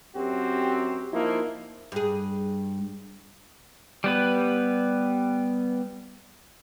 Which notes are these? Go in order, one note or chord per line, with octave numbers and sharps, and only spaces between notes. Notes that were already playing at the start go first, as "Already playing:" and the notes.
F#2 C4 F#4 G4
F3 A#3 D#4 E4
G2 G#4
G3 B3 B4